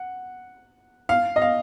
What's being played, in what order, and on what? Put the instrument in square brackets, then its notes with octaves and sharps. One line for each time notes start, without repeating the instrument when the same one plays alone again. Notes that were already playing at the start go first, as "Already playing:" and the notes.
Already playing: [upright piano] F#5
F5
D#5
F5